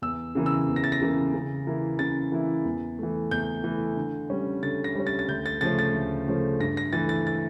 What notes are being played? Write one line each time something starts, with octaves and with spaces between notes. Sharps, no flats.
E2 E6
C#3 E3 A#3
E6
E2
A#6
A6
A#6
C#3 E3 A#3
C#3
E3 A#3 E4
C#3 A6
E3 A#3 E4
E2
E3 A3
E2 G6
E3 A3
D3
G3 C#4
D3 A6
A#6
G3 C#4
A6
A6
D2 G6
A6
C#3 F3 A3 C#4 A6
A6
D2
C#3 F3 A3 C#4
G2 A#6
A#6
E3 A3 A6
A6
A6